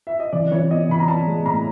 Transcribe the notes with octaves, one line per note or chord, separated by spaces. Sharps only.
E5
D#5
E3 D5
E3 C#5
B3 D#5
E3 B5
A#5
B3 A5
G#3
A2 A#5